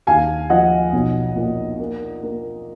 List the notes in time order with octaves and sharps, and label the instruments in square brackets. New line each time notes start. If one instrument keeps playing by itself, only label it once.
[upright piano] D#2 F5 G#5
F3 D#5 F#5
B1
A#2
A#3
A#3